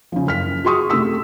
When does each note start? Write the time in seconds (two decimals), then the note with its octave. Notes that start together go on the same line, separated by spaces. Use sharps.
0.12 C#3 F3
0.27 F#1 F6 B6
0.65 F#4 G#4 C6 C#6 D#6
0.90 C3 A3 G4 E6 B6